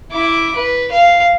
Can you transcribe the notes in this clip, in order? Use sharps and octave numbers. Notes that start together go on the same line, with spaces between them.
E4 D6
B4
F5